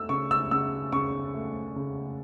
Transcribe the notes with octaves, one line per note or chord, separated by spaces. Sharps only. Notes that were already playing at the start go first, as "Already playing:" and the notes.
Already playing: A3 E6
C#3 C#6
E6
C#3 E6
C#3 C#6
A3
C#3